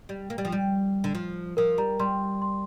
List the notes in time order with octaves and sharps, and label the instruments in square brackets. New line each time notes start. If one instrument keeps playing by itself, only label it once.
[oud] G3
A#3
G3
F3
G3
D3
F3
[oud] F3 [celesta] A#4
[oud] G3 [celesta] A#5
[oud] G3 [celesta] C6
[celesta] C6